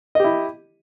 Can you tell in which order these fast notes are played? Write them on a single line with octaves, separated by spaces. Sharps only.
D#5 G4 E4